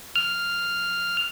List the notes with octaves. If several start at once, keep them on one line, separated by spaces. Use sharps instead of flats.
F6